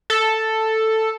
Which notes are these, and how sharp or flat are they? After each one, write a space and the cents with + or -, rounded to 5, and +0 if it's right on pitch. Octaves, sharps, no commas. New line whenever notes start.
A4 +5